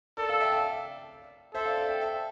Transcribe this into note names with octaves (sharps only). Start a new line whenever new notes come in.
A4 A#4 D5
D5 F5
E5 G5
D5 F5
A4 C5 E5
D5 F5
D5 F5
E5 G5
E5 G5